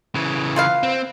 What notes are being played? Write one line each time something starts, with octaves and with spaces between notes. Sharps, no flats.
C#3 E3
F4 B4 F5
C4